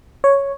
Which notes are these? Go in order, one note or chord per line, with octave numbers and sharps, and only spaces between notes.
C#5